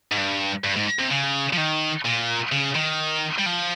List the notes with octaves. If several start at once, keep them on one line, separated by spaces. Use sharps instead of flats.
G#2
G2
G2
G#2
C3
C#3
F3
D#3
A#2
C#3
D#3
G3
F3